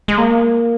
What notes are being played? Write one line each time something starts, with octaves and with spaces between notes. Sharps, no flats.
G#3
A#3